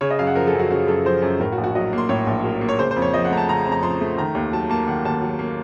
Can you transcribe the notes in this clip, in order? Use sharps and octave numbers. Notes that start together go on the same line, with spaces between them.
C#3 C#5
D#5
F#2 F5
F#5
F3 A#4
A4
F#2
F#4
C#3 F#4
F#2 A4
F3 C5
F#2
A2 A#4
F#4
A#1
F#4
F#3 D#5
A#3 C6
A2 C#5
A#1
F#3 A#4
A#3
C#5
C#3 C5
C5
F2
C#5
F3 D#5
F#5
A3 A#5
A5
C#3 A#5
F2
A#5
F3 C6
A3
D#3 A#5
D#2
F#3 A5
A#3 A5
D#3 F#5
D#2 A5
F#3
A#3